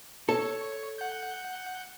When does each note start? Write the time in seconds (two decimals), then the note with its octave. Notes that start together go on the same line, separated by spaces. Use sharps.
0.29 A4 C#5
0.98 F#5 G6